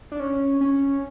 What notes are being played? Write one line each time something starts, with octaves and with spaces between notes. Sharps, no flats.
D4
C#4
C#4